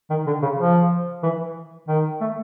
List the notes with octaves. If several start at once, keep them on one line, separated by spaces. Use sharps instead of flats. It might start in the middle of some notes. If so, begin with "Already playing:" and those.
D#3
D3
C#3
F3
E3
D#3
A3